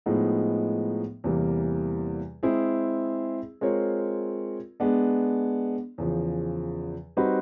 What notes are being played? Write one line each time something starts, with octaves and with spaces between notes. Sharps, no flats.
A2 F3 G#3 B3 D#4
E2 C3 E3 G3 A#3
G#3 C4 E4 G#4
G#3 C4 F4 A#4 C#5
G#3 B3 D4
E2 C#3 F3
G3 C4 D#4 F#4 B4